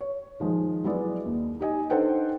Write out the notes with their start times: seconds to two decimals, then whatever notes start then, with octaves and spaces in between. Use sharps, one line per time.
0.01 C#5
0.40 D#3 F3 G#3
0.84 F#3 G#3 B3 E4 D5
1.26 D#2
1.59 D#4 G4 D#5 G#5
1.90 D4 D#4 A4 C5 F#5 G5